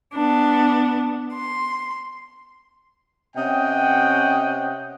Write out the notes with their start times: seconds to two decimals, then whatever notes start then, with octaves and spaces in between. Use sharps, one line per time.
0.13 B3 D4
1.35 C6
3.37 C3 C#4 D#5 F#5 G5